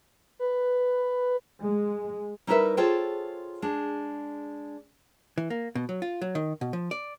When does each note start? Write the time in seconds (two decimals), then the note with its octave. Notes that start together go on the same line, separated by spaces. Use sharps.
0.39 B4
1.61 G#3
2.47 G3 D#4 E4 A#4 B4 E5
2.77 F4 G#4 A4 C5 C#5 G5
3.62 G#3 D4
5.38 E3
5.50 A#3
5.75 B2
5.89 F#3
6.02 F4
6.21 F#3
6.35 D#3
6.61 B2
6.73 F3
6.91 D5